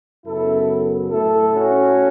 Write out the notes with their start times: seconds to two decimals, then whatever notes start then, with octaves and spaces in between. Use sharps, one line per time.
0.25 F#2 C#3 F#3 B3 E4 A4
1.10 A2 A3 E4 A4
1.53 C#4 F#4